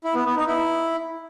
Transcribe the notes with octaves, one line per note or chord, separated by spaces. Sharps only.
E4
B3
B3
D#4
E4